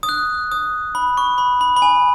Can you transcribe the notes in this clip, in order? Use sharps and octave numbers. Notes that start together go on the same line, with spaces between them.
D#6
F#6
D#6
B5
C#6
B5
B5
B5
G#5